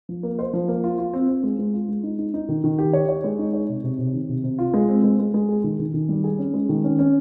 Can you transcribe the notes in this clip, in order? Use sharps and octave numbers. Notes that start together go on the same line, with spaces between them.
F3
A#3
C5
F3
A#3
F4
F4
C4
C4
G#3
G#3
F4
G#3
D#4
D#4
D#4
D#3
D#3
G4
C#5
C#5
G#3
D#4
C#5
C3
C3
C3
D#3
C3
C3
F4
G#3
C4
G#3
G#3
G#3
G#4
D#3
D#3
D#3
G3
G#4
C#4
G#3
D#3
C#4
C#4